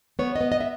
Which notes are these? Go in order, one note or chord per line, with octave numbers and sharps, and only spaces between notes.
B3 C#5
D#5
B3
D#5
E5